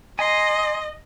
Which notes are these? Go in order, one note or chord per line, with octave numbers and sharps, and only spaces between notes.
D#5 G#5 A#5 C6